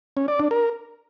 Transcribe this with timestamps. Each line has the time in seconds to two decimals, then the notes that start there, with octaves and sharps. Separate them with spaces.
0.17 C#4
0.28 D5
0.40 D4
0.51 A#4